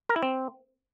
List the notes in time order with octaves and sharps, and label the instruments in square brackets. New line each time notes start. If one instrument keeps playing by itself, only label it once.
[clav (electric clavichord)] A#4
E4
C4